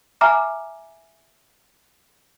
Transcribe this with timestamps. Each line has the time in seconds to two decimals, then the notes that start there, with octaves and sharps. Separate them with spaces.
0.21 E5 G#5 A#5 D6 F6